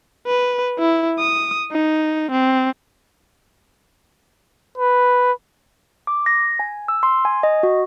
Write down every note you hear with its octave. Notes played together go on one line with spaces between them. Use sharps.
B4
E4
D#6
D#4
C4
B4
D6
A#6
G#5
E6
C6
G#5
D#5
F#4